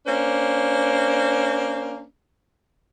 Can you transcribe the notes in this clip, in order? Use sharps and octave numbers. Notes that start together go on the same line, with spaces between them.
A#3 C#4 D4 C5